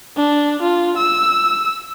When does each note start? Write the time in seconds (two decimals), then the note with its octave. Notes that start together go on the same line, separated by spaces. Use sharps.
0.17 D4
0.62 F4
0.97 E6